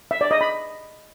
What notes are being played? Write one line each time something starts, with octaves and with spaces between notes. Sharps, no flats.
E5
D5
D#5
B5